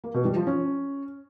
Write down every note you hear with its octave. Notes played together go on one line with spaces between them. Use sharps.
A#3
B2
G3
F3
C#4